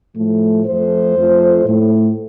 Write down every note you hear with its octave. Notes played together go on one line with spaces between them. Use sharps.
A2 F3 A3
F2 F3 A3 C5
F2 F3 A3
A2 A3